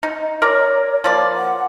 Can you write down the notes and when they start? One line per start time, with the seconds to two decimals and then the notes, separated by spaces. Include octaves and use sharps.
0.03 D#4
0.42 A#4 C#5 D5 A#5
1.04 F3 A#3 D5
1.35 F#5